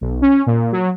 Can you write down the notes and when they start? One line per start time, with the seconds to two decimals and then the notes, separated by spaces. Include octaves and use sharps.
0.01 B1
0.22 C#4
0.47 A#2
0.72 F#3